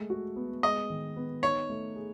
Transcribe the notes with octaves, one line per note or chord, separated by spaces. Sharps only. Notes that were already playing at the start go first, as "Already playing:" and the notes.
Already playing: G#3 A3
F#4
B3
G#3 D#5
D#3
B3
D#4 C#5
A3
G#4